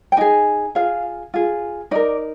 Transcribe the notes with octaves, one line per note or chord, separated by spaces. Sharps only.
G5
D#4 G#4 G#5
F4 G#4 F5
F4 G#4
D#4 A#4 D5